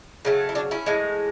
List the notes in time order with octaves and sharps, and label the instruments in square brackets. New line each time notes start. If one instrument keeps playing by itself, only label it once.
[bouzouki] C#3 F#3 A3
E4
D4 F#4
C#4 E4
A2 E3 G#3